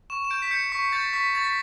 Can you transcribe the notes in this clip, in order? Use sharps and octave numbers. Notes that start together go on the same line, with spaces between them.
C#6 E7
E7
G6 D7
B6
G6 C#7
C#6 B6
G6 A6
C#6 B6
C#6 A6
B6